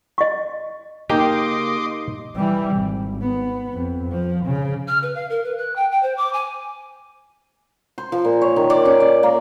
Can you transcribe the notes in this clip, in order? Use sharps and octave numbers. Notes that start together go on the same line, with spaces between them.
D#5 C#6
C#3 A#3 D#4 G4 D#5 C6 D6
E3 G3
G#1
B3
F2
F3
C#3
F6
B4
F5
A#4
B4
F#6
G5
G5
C5
D6
G#5
C5
F3
A#2
C#5
D#3
D5
C#4
D5
A#3